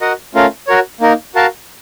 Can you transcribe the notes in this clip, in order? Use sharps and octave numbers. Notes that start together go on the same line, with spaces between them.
F#4 A#4 D#5 F#5
A3 C#4 F4 A#4 F5
F#4 A#4 C#5
A#3 D#4 A#4
F#4 A#4 F5 A5